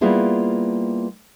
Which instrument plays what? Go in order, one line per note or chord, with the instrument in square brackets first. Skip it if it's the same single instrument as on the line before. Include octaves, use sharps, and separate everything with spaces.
[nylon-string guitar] G3 A#3 B3 E4 F4 G#4